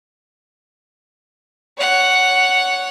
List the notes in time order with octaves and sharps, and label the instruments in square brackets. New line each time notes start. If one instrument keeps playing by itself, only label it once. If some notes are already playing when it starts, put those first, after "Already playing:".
[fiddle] C#5 F#5